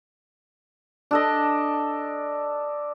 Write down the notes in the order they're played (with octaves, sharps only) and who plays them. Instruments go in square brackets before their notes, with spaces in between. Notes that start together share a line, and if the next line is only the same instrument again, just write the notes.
[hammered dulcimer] D4 A4 D#5